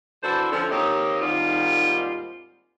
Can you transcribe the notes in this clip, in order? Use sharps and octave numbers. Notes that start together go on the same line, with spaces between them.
E3 D4 E4 F#4 A4 C5
D3 F3 A3 C4 C#4
D#3 A#3 C4 G4 C#5 D#5
D#2 G#2 D#3 G3 C4 F4